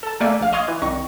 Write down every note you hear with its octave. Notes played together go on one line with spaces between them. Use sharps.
A4 A5
A3 A#3 D5 G#5
A#1 F5 F6
D#5 F5 C6 C#6 D#6 G#6
E3
C2 D#3 C#6 A#6